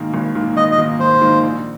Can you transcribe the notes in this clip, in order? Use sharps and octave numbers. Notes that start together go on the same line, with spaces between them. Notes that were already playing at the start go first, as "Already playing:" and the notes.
Already playing: G#2 D#3 A#3
G#1
G#2 D#3 A#3
G#1 D#5
D#5
G#2 D#3 A#3
G#1 C5
G#2 D#3 A#3
A#1